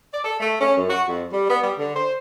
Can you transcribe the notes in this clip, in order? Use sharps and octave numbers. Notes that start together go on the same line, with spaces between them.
D5
A4
A3
C#4
F#2
F#4
F2
G3
B3
G3
D3
C5